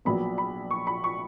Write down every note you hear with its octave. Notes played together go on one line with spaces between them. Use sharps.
A#1 A#2 F#3 B3 B5
B5
C#6
B5
C#6